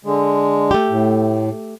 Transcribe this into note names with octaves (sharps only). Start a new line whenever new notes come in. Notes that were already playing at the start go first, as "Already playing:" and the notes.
D3 G#3
A3 G4
A2